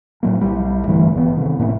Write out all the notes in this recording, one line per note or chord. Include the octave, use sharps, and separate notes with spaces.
A2 F#3 A#3
B1 G3
G2 D3 E3 A3
G#1 G2 D3 B3
C3 D#3
G1 A2 A#3 C#4